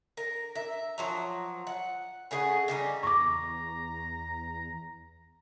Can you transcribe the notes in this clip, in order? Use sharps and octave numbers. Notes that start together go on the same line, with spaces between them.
A#4
E5
F3 F#3 A#5
F#5
C#3 A3 G#4 F#5
C#3 G3 D#4
E2 A#5 C#6 D6